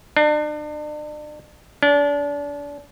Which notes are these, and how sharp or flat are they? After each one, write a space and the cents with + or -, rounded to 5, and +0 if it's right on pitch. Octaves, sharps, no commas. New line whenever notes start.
D4 +40
D4 -30